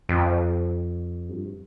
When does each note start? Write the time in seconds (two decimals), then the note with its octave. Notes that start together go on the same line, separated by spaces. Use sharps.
0.09 F2
1.29 G2